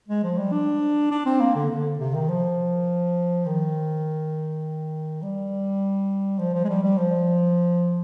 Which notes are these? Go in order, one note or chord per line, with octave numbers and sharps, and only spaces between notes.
G#3
F3
G3
D4
D4
C4
A#3
D3
D3
C3
D#3
F3
D#3
G3
F3
F3
G#3
G3
G3
F3